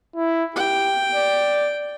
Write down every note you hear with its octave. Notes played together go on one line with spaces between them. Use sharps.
E4
G4 G5
D5